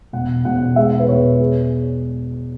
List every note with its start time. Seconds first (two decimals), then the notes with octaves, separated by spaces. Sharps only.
0.13 E1 F#5
0.45 E1 F#5
0.76 G#3 E5
1.00 B4
1.08 E1 C#5
1.40 G#4